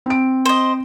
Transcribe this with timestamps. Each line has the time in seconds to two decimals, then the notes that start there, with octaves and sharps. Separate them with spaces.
0.06 C4 D7
0.45 C5 D#5